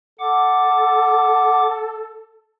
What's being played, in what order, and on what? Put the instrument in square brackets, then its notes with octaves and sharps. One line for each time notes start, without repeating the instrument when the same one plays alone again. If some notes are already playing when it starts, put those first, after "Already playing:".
[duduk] A4 [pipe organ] F#5 D6